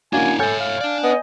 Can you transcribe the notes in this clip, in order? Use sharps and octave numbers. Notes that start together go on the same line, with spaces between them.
A#3 C#4 D4 E4 F#4 G#5
A4 C#5 E5 G#5 G6
F5
D4 D5
B3 D#5